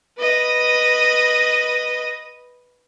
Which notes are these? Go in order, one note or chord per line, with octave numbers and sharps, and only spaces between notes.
B4 D#5